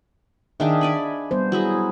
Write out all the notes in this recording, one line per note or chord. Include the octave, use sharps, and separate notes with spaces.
D#3 D4 G#4 E5 F5
D5 G#5 B5
G3 B3 C5
F#3 E4 G#4